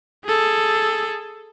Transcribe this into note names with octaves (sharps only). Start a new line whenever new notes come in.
G#4 A4